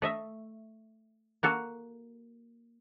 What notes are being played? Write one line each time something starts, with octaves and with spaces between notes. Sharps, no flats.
A3 D#5 E5
A#3 F#4 A4